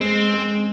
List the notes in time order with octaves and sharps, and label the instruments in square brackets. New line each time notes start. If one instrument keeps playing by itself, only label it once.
[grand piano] G#3 [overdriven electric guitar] C4
[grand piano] G#3